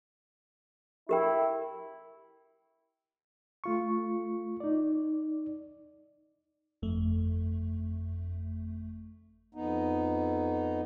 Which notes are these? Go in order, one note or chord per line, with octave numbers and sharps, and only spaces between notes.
E4 G4 A#4 G5
A3 F4 C#6
D#4 D5
G1 F2 A3
F2 B3 D#4